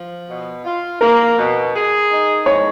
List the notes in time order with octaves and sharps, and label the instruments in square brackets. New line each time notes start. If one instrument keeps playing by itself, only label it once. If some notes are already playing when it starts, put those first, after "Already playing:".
Already playing: [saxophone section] F3
B2
F4
[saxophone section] A#3 [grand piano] A#4
[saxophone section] B2
G#4
D#4
[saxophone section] G#3 [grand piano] C#5